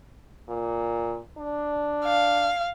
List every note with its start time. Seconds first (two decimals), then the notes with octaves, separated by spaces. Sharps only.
0.49 A#2
1.38 D4
2.05 F5